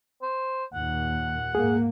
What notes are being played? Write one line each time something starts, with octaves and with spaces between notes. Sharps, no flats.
C5
D#2 A#2 F#5
G#2 A#3 G#4